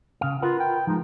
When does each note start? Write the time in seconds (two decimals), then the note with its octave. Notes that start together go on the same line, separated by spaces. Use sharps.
0.21 C#3 F5
0.42 F4 A#4 B4 F#5
0.60 G5
0.87 F3 G#3 D#4